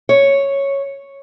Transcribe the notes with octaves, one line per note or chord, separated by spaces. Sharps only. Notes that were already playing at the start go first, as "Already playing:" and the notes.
C#5